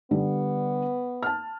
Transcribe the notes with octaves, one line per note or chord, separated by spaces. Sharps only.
D3 G3 B3
A5 F6